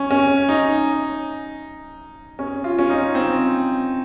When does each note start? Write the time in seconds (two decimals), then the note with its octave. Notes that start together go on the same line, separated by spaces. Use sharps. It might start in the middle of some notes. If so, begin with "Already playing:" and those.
Already playing: C#4
0.11 C#4
0.49 D#4
2.39 C#4
2.64 F4
2.79 C#4
2.90 D#4
3.15 C4